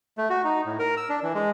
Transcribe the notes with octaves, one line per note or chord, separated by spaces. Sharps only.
A3
F#4
D#4
A2
A#4
E6
D4
E3
G#3